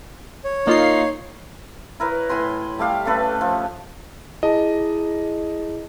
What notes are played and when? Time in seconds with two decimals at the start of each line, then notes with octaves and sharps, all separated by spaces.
0.44 C#5
0.67 A#3 D#4 F4 C7
2.00 E4 A#4 B4 C#5
2.29 A2 G#5 B5 C6
2.78 G3 A3 G4 F5
3.06 A3 C#4 A4 B4
3.41 F3
4.43 E4 G#4 D#5 A5